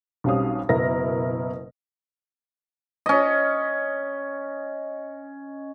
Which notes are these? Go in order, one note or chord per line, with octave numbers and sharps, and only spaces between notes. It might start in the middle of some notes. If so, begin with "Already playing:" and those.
B1 G3 C4 C#4 F5 D#6
F#1 B2 E4 A#4 A#6
C#4 D#5